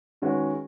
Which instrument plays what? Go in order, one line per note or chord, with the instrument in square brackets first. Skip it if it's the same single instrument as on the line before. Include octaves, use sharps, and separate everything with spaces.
[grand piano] D#3 G#3 C#4 F#4 B4